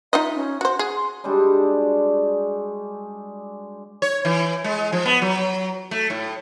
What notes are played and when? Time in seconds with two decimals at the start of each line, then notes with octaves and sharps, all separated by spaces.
0.13 D#4 F4 D#5 E5
0.36 C#4
0.61 F#4 C5 F#5
0.79 G#4
0.95 C6
1.24 G3 G#3 D4 F#4
4.02 C#5
4.25 E3
4.64 G#3
4.93 F3
5.06 B3
5.22 F#3
5.91 A3
6.10 A2